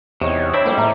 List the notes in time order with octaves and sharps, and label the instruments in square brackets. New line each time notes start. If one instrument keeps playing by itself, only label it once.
[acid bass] E2 [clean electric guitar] C3 [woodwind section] D#4 C#5
[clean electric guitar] C4 D4 E4 [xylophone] C#5 [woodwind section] B5
[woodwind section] F2 G#2 G3 [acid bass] A#3
[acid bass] A2 [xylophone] E5 A#5